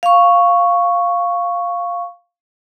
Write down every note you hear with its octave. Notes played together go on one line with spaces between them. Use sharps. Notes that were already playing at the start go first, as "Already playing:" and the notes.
F5 C#6